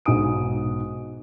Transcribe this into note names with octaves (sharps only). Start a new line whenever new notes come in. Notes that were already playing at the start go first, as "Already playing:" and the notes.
B1 G#2 F#4 G#5 D#6 D7